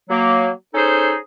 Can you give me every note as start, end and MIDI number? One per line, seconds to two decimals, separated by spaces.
0.10 0.49 54
0.10 0.49 58
0.75 1.16 61
0.75 1.16 63
0.75 1.16 68
0.75 1.16 69
0.75 1.16 72